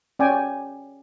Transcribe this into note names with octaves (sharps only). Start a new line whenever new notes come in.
C#4 D5 G5 G#5